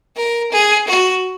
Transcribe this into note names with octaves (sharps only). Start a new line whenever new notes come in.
A#4
G#4
F#4